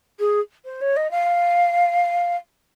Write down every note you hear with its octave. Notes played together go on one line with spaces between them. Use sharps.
G#4
C5
C#5
D#5
F5